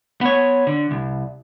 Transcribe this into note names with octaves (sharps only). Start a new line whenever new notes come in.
B3 C#5
D3
C2